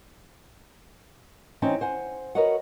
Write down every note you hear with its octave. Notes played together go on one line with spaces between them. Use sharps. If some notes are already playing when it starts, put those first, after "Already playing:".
E3 C4 C#4 D#4
C5 F#5 G#5
F#4 A#4 B4 C#5 D#5 F#5